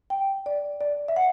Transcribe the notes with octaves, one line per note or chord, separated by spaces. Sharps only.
G5
D5
D5
E5
F#5